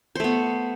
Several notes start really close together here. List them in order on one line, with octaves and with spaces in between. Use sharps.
C5 A3 B3